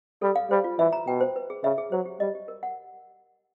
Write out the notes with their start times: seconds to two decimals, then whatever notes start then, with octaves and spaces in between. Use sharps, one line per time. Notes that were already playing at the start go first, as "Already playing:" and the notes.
0.22 G3 A4
0.36 F5
0.50 G3 C5
0.64 F4
0.79 E3 E5
0.93 A#5
1.07 B2 G5
1.21 C5
1.36 B4
1.50 G#4
1.63 C#3 E5
1.78 G#4
1.92 F#3 C5
2.06 G4
2.20 G3 D#5
2.35 G4
2.48 A#4
2.63 F#5